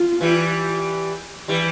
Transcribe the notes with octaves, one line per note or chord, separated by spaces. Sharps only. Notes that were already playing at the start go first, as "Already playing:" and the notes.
Already playing: F4
E3 G3
E3 G3